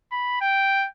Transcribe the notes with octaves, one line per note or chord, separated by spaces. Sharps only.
B5
G5